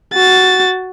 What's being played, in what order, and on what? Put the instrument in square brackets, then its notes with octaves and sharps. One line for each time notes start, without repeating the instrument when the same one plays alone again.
[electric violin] F#4 A6